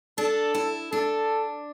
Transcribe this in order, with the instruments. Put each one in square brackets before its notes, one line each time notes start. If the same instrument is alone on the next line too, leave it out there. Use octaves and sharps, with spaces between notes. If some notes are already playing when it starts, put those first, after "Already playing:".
[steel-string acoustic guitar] D4 [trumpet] A4
[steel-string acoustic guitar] E4
[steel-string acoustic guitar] D4 [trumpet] A4